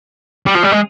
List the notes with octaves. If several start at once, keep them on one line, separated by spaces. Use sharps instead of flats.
G3
F3
G3
G#3